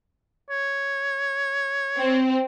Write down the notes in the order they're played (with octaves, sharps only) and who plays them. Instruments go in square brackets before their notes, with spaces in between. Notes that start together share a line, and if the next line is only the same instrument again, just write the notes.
[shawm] C#5
[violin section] C4